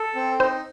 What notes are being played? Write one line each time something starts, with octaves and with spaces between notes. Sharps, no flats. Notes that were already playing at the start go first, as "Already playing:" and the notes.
Already playing: A4
C4
D#4 C5